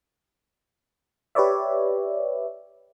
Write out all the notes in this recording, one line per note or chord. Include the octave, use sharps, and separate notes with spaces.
G4 B4 C#5 D5 E5